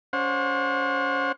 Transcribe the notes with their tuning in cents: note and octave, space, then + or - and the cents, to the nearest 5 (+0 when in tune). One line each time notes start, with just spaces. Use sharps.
C#4 +25 C5 +20 F#5 -35